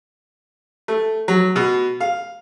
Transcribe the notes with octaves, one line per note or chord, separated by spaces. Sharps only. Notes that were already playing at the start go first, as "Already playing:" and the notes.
A3
F#3
B2
F5